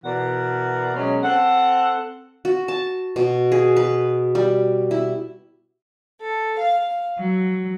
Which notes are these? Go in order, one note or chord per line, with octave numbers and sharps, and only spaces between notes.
B2 E3 A#4 D5 F#5
B2 F#3 G#3 C#4
C4 A4 F#5
F#4
A5
B2
G#4
B4
G3
E4
A4
F5
F#3